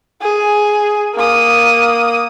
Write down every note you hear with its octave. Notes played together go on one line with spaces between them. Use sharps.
G#4
A#3 D#6